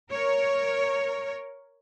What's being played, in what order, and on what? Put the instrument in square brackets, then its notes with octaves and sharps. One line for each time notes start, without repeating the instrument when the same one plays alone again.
[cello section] A#4 C#5